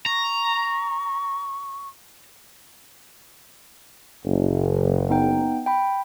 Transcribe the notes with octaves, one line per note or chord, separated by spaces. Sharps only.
A#5 C#6
F#1
B3 D#4 G5
G5 B5